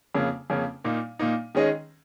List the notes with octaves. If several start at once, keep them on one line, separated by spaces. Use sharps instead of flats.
F2 C#3 A#3 C#4
F2 C#3 A#3 C#4
A#2 A#3 D#4
A#2 A#3 D#4
D#3 G#3 C#4 G#4 D#5